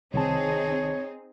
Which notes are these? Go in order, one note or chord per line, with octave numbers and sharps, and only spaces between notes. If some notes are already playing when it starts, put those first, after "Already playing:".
C2 D#3 C4 D#4 G#4 C#5 A5